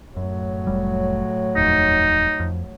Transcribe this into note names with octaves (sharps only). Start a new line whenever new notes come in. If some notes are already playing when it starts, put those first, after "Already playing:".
F#2 A2 F#3
F1 G3
D#1 F2 D#4
F2